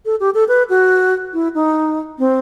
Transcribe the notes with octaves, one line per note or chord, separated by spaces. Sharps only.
A4
G4
A4
B4
F#4
E4
D#4
C4